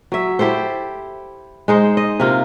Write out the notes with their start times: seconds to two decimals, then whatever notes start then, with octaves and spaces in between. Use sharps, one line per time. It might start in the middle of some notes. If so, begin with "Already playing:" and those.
0.12 F#3 E5
0.39 E4 G4 A4 C5
1.68 G#3 D#4 C5
1.97 D#5
2.20 C3 A#3 F4